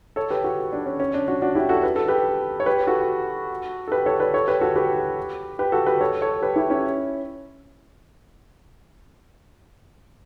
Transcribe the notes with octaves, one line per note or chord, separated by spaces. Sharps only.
A4 C#5
G4 B4
F#4 A4
D4
C#4
C#4
D4
D4 F#4
D4 F#4
E4 G4
F#4 A4
B4
A4
G4 B4
C#5
G4 B4
G4
F#4 A4
A4
G4 B4
A4 C#5
B4 D5
A4 C#5
G4 B4
F#4 A4
G4 B4
G4 B4
F#4 A4
G4 B4
A4 C#5
A4 C#5
G4 B4
E4 G4
C#4 E4